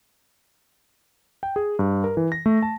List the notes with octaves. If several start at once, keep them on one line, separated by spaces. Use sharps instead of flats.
G5
G#4
G2
A#4
E3
A#6
A3
A5